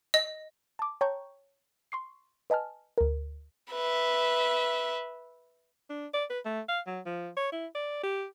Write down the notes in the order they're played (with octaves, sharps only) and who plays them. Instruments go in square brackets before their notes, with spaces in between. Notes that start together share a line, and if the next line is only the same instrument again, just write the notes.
[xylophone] D#5
[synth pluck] A5 D6
C#5 G5 A5 A#5 C#6 G6
C6 C#6 C7
B4 D#5 G#5 A5 F6
D2 A#4
[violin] B4 E5
[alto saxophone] D4
D5
B4
A3
F5
F#3
F3
C#5
E4
D5
G4